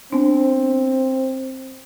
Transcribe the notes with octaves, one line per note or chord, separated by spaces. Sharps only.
B3 C4 D4